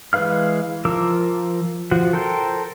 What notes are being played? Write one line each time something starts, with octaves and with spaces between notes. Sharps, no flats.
E3 G#3 B4 F5 F6
F3 A#4 D6 E6
F3 F#4
A4 A#4 C5 G5